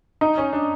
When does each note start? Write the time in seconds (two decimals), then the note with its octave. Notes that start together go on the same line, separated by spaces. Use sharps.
0.21 D#4
0.38 C#4
0.53 D4